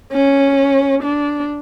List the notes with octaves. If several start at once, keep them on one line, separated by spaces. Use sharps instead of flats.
C#4
D4